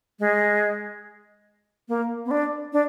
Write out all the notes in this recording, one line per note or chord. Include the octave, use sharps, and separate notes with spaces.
G#3
A#3
B3
D4
D4